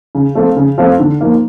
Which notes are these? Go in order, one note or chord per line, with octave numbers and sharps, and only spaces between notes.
C#3
F3 A3 C4 F4
C#3
F3 A3 C4 F4
D3
F3 A#3 D#4